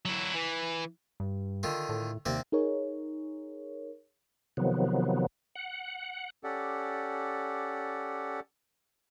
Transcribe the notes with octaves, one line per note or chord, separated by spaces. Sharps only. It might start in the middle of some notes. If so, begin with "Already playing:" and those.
F#3 E4
E3
G2
D3 D#3 F4
A2
D#2 C3 A#3 D5
D#4 G#4 A#4 C#5
C3 D#3 F3 F#3 B3
F#5
C#4 G4 A4 D5 F#5